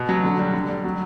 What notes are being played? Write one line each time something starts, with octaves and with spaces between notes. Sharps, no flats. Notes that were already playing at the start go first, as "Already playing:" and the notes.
Already playing: B2
F#3
D3
G3
D3
G3
F#3